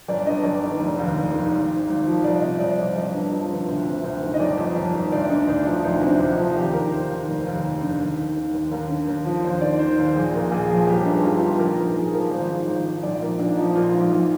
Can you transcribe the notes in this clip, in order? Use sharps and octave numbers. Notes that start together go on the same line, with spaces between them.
G1 D5
G2 D#5
G1 D5
D#3
F1
D#2
F1
D#3
G#1
G#2
G#1
F3
C2 D5
C3 D#5
C2 D5
F3 D5
G1 D#5
G2
F3
D3
D2
C3
D2
D#3
D#5
G1 D5
F2
G1
D#3
D2 D5
D3 D#4
D2 D4
F3 D#4
D2 D#4
C3
D4
D2
D#4
F3
D#2 G4
D#3 A#4
D#3 C5
D#2 C5
F1
D#2
F1
D3
D#2
D#3
D#3
D#2
D#2 A#4
D3
D#2
F3
D#2 C5
D#3 D5
D#3 C5
D#2
A#1 G#4
A#2 A#4
A#1 G#4
F3 G#4
G1 G4
G2 D#4
G1 F4
D3 G4
A#1 A#4
G#2 A#4
A#1 G#4
F3 A#4
G#1 C5
G#2
G#1
D#3
A#1 D5
G#2 A#4
A#1 D4
F3 D#4
A#1 F4
G#2
A#1